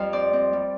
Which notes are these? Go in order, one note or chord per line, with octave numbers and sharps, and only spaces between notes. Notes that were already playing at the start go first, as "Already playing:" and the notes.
Already playing: F2 G3 F5
C4 D5
C4
G3